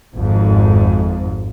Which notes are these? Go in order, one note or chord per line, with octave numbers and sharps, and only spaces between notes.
G#1 F2 G#2